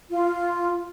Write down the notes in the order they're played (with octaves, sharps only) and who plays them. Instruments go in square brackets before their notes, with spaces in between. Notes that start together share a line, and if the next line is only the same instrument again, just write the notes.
[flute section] F4